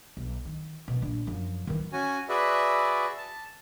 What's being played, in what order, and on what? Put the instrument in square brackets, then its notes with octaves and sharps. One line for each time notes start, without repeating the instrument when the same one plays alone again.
[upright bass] B1
D#3
B2 D#3
A#1 D4
F#2 F3
D#3 E3
[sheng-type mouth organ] C#4 F#4 G#5
F#4 G#4 B4 D5 E5
A5